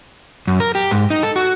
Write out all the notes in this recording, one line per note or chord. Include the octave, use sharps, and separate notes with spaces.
F#2
A#4
G4
G#2
D#4
A4
F#4